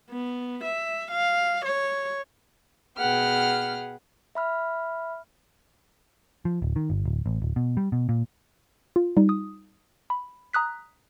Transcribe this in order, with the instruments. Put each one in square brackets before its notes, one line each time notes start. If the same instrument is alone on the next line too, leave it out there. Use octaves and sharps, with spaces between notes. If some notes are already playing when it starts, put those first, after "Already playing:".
[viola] B3
E5
F5
C#5
[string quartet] B2 G#4 B4 F#5 G5 F6
[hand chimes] E5 B5 F6
[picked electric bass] F3
D1
D#3
G1
D1
A1
D1
B2
G3
B2
A#2
[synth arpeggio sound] F4
G3 D#4
D#6
B5
A#5 D#6 F#6 B6